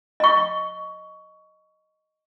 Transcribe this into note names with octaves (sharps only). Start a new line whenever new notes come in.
D#5 C#6